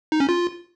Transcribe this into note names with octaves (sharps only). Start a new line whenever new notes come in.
D#4
C#4
F4